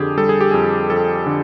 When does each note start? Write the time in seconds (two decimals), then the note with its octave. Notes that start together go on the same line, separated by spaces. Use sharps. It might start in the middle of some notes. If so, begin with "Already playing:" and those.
Already playing: F2 D3 G4 G#4
0.17 G3 A4
0.29 G#4
0.41 G4
0.51 F2 G#4
0.90 F2 A4
1.26 D3